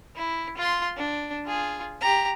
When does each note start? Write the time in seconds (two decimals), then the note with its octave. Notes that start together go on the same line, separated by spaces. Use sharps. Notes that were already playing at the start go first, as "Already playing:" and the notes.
0.16 E4
0.57 F4 C6
0.96 D4
1.46 F4 G#4
2.01 G4 A#5